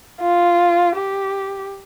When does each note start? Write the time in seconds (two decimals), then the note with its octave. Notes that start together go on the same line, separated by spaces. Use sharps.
0.21 F4
0.96 G4